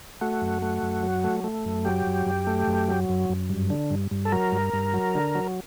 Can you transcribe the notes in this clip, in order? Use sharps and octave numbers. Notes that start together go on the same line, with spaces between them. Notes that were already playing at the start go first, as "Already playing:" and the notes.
A3 F#4
F#2
A3
F#2
F#3
A3
A3
F#2
F#3 G4
F#2
F#2
A3
F#2
F#3
F#2
F#2
G2
D3
G2
G2
A4
F#3 A#4
G2
G2
F#3
D3
F#3